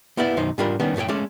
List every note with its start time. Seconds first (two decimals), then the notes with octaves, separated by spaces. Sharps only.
0.17 A#3 B3 E4 G4 D5
0.37 B1 F#2 D#3 F#3 D#4 C5
0.58 G#2 G3 D4 F4 A#4 B5
0.80 D#2 D#3 G3 B3 C#4 D4
0.96 F#2 A2 A4 C#5 G5
1.08 G#3 A3 C#4 A4 D5